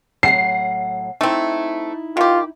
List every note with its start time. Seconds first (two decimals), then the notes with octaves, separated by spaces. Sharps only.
0.23 A2 F#3 F#5 C7
1.21 A3 C4 D#4 E4
2.17 D#3 F4 G4